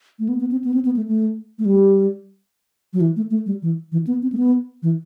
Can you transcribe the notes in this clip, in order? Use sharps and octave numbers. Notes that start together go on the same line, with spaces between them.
A3
B3
B3
C4
B3
C4
B3
A3
A3
A3
G3
F#3
E3
A3
A3
G3
E3
E3
B3
C4
A3
B3
E3